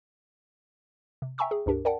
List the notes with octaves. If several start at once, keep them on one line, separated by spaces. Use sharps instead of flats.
C3
E5 G5 G#5 A#5 C#6 E6
G#4
C#2 G2 D4 G4 A#4
A#4 D5 F#5 G5 A5